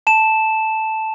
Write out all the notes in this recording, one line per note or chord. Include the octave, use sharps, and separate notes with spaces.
A5 E7